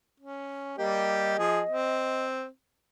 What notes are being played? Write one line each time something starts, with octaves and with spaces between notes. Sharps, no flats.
C#4
G3 A#3 G4 D#5
F3 G#4
C4